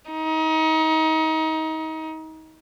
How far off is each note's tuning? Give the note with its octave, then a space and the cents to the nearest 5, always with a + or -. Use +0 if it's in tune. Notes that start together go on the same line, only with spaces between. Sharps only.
D#4 +30